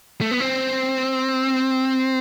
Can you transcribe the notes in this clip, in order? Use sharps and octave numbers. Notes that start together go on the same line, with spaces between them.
A3
B3
C4